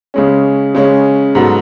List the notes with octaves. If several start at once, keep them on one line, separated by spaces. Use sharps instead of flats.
C#3 G#3 C#4
C#3 G#3 C#4
G#2 F#3 B3 F#4 A4